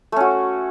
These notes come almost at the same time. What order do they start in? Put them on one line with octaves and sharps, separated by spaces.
A3 C#4 F#4